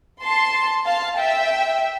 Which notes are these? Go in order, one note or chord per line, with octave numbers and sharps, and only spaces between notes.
A5 C6
F5 A5
E5 G5